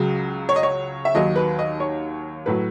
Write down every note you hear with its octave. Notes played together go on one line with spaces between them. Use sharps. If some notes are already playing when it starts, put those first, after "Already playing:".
Already playing: C#2 C#3 F#3
C#5
D#5
C#5
E5
D#2 D#3 F#3 D#5
B4
D#5
C#5
A2 F#3 B4